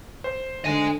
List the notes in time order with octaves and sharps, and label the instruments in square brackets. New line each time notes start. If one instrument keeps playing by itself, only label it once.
[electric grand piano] C5
[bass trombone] D3 [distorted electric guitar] D#5 G#5